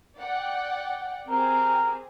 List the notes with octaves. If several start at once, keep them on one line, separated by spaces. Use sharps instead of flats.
D5 F#5 G5
C4 G4 G#4 A#4